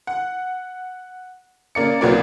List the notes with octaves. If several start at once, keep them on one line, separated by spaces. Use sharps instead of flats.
F#5
C#3 A#3 D5 C#7
C2 C#3 F#3 A#3 B4 D5